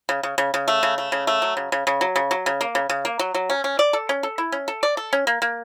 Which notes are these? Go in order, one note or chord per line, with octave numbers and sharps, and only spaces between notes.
C#3
C#3
C#3
C#3
A3
C#3
A3
C#3
A3
F#3
C#3
C#3
C#3
F#3
C#3
F#3
C#3
A#3
C#3
C#3
A#3
F#3
F#3
C#4
C#4
D5
A4
C#4
A4
E4
C#4
A4
D5
A4
C#4
A#3
A#3